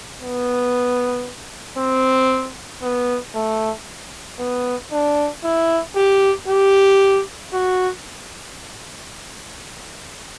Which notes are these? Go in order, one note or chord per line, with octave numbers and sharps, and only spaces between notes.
B3
C4
B3
A3
B3
D4
E4
G4
G4
F#4